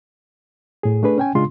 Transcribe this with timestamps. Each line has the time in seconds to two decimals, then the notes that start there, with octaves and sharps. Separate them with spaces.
0.83 A2 G#4
1.03 A3 D4 G#4 B4
1.18 C#4 G5 G#5
1.35 C#3 G#3 D4 F4 C6